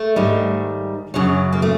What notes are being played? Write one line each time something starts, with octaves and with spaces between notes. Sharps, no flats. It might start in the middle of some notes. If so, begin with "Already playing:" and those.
Already playing: A3
G#2 D#3 G3
F#2 C#3 F#3
A#3
A3